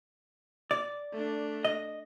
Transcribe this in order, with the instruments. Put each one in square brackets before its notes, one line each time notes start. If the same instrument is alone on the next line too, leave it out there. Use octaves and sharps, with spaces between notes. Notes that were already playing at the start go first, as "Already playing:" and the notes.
[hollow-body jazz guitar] D5
[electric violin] A3 D4
[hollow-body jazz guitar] D#5